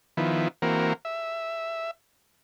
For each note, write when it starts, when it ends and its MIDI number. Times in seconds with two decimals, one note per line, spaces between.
0.17 0.48 51
0.17 0.48 53
0.17 0.48 59
0.17 0.48 64
0.62 0.93 52
0.62 0.93 58
0.62 0.93 60
0.62 0.93 66
0.62 0.93 70
1.05 1.91 76